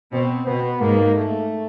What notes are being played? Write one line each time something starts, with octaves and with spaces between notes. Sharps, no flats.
B2 C4
B2 B3
G#2 A#3
A3